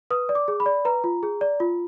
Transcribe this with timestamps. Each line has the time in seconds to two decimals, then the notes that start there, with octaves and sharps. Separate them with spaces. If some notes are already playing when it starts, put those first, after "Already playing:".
0.10 B4 D#6
0.29 D5
0.35 D6
0.48 G#4
0.60 B5
0.66 D5
0.85 B4 A#5
1.04 F4
1.23 G#4
1.41 D5
1.60 F4